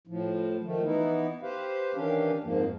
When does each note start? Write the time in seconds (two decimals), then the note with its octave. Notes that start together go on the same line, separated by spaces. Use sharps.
0.07 A2 F3
0.64 D#3 F3 A3
0.85 E3 B3 D#4 E4
1.43 G4 B4 C5 F5
1.95 D#3 E3 C#4 D4 G4 F5
2.44 F2 G#2 F3 A#3